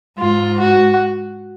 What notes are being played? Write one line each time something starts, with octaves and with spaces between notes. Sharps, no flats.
G#2 F4
F#4